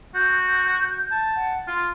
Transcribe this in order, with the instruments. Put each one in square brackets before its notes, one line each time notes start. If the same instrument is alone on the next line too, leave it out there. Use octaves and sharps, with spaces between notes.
[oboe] F#4 [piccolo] G6
[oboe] A5
[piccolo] F#5
[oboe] F4 [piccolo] C6